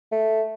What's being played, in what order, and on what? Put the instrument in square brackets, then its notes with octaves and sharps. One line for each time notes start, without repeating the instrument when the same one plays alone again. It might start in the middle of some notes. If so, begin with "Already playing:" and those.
[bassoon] A3